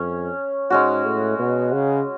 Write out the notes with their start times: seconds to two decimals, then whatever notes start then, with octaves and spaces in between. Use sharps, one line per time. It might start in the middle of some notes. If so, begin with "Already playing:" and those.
Already playing: F2 C#4
0.70 G#2 G#3 C#4 F#4
1.05 A2
1.39 B2
1.73 C#3